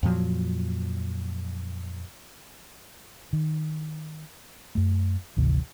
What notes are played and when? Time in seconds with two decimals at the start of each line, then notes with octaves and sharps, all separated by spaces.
0.03 F2 A#2 F3 F#3
3.33 D#3
4.75 F#2 A3
5.37 G#1 D2 C3 E3